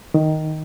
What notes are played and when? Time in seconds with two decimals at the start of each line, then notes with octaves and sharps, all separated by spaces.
0.14 D#3